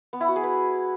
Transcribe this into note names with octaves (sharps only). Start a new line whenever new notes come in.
B3
E4
F#4
G#4
B4